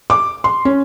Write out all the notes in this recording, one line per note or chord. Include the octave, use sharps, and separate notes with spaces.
D6
C6
C#4